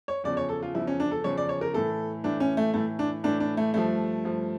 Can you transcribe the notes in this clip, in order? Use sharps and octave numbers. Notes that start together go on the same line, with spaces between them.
C#5
E2 C#3 F3 D5
C#5
A4
F4
E2 C#3 F3 E4
C#4
D4
A4
E2 C#3 F3 C#5
D5
C#5
A#4
A2 E3 A4
A2 E3 D4
C#4
A3
A2 E3 A3
D4
A2 E3 D4
D4
A3
G2 F3 A3
G2 F3